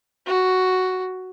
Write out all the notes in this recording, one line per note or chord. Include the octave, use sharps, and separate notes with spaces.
F#4